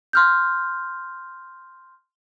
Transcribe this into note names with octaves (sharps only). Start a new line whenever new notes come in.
C6 F6 G6